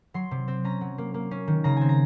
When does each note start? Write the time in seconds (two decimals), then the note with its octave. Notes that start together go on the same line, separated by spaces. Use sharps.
0.14 F#3 C6
0.31 C3
0.48 C4
0.64 C#4 A#5
0.81 F#3
0.98 A#3
1.14 A#3
1.31 C#4
1.47 D#3
1.64 C#3 A#5
1.77 C4 G#5
1.89 A#5